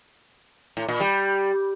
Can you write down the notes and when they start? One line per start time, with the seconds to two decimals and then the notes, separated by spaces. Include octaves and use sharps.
0.77 A2
0.88 A#2
1.00 G3